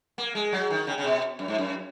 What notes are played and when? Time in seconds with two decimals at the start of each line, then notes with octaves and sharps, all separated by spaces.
0.18 A#3
0.35 G#3
0.52 F#3
0.70 D#3
0.87 C#3
0.98 C#3
1.04 B2
1.39 F#2
1.48 G#2
1.58 F#2